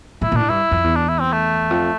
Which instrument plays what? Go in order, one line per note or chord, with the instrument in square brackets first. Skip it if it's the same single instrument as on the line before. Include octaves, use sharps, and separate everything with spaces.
[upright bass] A2 [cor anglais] E4
[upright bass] A#2
[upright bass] A2 [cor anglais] D4
[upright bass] G2 [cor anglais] E4
[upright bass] F2
E2
[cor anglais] D4
E4
C4
A3
[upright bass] F2